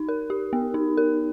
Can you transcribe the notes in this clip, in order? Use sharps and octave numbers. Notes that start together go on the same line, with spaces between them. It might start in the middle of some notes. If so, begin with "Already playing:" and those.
Already playing: D#4
A#4
G4
B3
D#4
A#4